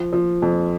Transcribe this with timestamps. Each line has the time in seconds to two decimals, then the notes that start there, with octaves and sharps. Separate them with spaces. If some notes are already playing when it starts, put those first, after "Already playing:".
Already playing: F3
0.13 F3
0.42 F2